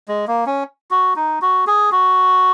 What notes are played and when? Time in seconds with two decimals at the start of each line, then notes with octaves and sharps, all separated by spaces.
0.08 G#3
0.27 A#3
0.46 C#4
0.91 F#4
1.16 D#4
1.42 F#4
1.67 G#4
1.92 F#4